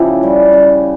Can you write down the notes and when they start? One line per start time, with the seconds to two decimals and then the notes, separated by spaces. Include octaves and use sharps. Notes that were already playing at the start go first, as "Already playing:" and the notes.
Already playing: C#3 F3 E4 G4 A4
0.22 G3 C#4
0.53 C#3